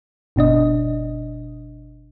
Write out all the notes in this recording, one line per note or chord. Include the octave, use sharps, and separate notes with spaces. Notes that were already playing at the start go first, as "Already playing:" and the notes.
G1 B2 D4 D#5